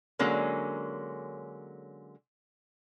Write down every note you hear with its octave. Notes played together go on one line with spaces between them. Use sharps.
D3 F#3 G#3 A#3 C#4